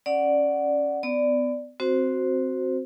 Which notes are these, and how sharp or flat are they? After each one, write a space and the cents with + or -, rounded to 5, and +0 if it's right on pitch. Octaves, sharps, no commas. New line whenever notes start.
C#4 +0 D5 +0 F#5 +0
B3 +30 D5 +0
C4 +0 F#4 +0 C5 +0